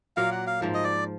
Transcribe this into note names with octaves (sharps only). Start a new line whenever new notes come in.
A#2 F#3 A#3 F5
F#5
F5
G#2 F3 A#3
D#5
D5